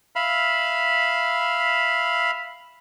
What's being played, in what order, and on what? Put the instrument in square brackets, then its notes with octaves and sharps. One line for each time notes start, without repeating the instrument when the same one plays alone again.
[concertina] E5 F5 B5